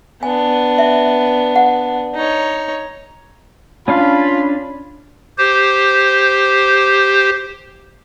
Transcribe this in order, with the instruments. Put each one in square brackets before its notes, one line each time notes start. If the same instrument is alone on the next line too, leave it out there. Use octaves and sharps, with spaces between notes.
[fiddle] B3 D4 [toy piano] G#5
[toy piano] E5
F#5
[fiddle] D#4 C#5
[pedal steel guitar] C#4 D4 F5 [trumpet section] F4 B5
[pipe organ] G4 C5